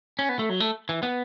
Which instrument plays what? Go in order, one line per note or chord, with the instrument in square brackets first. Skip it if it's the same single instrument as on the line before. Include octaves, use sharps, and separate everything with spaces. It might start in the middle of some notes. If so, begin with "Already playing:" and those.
[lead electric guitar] C#4
B3
A3
F#3
A3
E3
B3